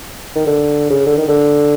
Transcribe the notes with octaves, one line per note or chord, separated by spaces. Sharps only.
D#3
D3
C#3
D3
D#3
D3